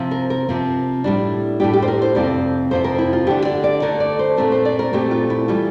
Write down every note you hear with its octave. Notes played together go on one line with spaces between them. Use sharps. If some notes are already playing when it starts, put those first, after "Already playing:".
Already playing: C3 F3 C4
A#4
A#4
C3 F3 C4
A2 G3 D4
A2 G3 D4 G4
G4
C5
A#4
C5
F2 C3 F3 C4 D5
F2 C3 F3 C4 C5
A#4
E4
F4
D3 A3 D4 G4
D5
D5
D3 A3 D4 A#4
D5
C5
A#2 A3 C4 A#4
C5
D5
A#4
A#2 A3 C4 G4
F4
E4
E3 G3 F4